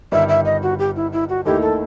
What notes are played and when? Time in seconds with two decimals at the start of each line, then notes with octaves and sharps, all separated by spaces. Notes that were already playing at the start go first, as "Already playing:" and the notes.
0.12 G1 G2 D#3 G3 E5
0.29 E5
0.45 D#5
0.62 F#4
0.79 G4
0.96 E4
1.12 E4
1.29 F#4
1.45 D#2 D#3 A3 E4 G4
1.62 A4